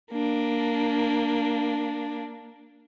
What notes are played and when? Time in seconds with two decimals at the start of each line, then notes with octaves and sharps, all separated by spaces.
0.12 A#3 D4